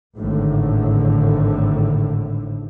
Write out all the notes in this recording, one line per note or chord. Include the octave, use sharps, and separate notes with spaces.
G#1 A2 D3